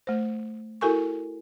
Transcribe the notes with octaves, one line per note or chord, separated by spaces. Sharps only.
A3 C5
E4 F#4 A4 A#4 G#5 C#6